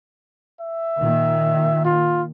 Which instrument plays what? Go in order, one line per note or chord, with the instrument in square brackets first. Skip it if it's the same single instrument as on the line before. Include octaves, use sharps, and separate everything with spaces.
[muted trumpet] E5
[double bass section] A#2 D#3
[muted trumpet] F4